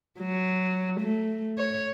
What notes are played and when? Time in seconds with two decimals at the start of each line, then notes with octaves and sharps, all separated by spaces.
0.20 F#3
1.01 A3
1.58 C#5